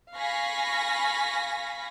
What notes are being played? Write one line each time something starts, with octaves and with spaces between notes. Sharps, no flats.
F5 G#5 B5 C#6 A#6 B6